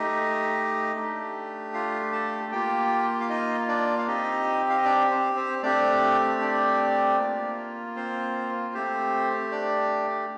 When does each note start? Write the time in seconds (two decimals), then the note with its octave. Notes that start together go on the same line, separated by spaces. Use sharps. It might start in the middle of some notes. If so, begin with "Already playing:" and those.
Already playing: A3 D#4 G4 D#5
0.96 A3 D4 G4
1.74 F4 F5
2.13 A4 A5
2.52 A#3 F4 G4 G5
3.21 F5
3.29 D#4 D#5
3.68 D4 D5
3.98 F5
4.07 C4 D#4 G4 D#5
4.70 F5
4.77 D#5
4.85 D4 D5
5.11 C4 C5
5.36 C4 C5
5.63 A3 C4 D4 G4 D5
6.41 D4 D5
7.18 A#3 F4
7.96 C4 C5
8.74 A3 C4 G4 C5
9.52 D4 D5